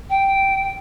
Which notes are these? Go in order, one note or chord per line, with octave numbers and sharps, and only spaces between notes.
G5